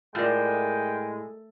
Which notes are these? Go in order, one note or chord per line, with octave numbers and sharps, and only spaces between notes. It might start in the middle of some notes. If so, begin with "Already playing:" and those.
A2 G#3 F4 A#4 D5 G5